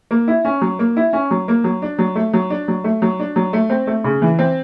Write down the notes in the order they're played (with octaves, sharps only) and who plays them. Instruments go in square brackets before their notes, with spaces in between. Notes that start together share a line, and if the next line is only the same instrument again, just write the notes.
[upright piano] A#3
E4
C#4
F#3
A#3
E4
C#4
F#3
A#3
F#3
D4
F#3
A3
F#3
D4
F#3
A3
F#3
D4
F#3
A3
C4
A3
C#3
E3
C4